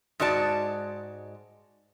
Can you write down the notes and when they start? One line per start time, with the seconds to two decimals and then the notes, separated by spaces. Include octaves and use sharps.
0.20 G#2 G#3 F#4 D5 A5